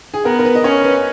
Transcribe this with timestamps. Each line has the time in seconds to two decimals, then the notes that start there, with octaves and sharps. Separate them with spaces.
0.14 G#4
0.25 B3 A#4
0.39 A#4
0.45 B4
0.55 D#5
0.64 C#4 C#5
0.84 B4